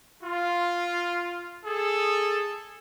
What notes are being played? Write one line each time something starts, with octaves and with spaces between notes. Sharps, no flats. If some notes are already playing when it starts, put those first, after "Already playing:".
F4
G#4 A4